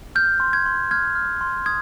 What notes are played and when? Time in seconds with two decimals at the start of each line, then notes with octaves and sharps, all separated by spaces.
0.15 F6 G6
0.40 C6
0.53 G#6
0.66 C6
0.91 F6 G#6
1.15 F6
1.41 C6
1.66 D#6 G#6